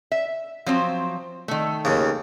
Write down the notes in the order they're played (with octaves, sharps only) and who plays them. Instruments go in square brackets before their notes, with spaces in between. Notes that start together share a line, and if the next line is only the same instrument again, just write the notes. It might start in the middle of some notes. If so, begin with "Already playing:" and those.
[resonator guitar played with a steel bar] E5
F3 F#3 C4
D#3 A3
[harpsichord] D#2 C#3